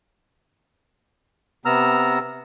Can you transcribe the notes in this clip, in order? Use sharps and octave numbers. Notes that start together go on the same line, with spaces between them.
C3 B3 A#5 E6 F6